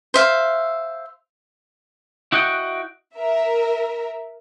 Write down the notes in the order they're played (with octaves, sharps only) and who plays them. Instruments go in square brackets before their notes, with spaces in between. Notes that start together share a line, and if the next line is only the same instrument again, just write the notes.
[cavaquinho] C5 E5 F5
[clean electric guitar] E4 F#4 D#5 F#5 G5
[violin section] A#4 E5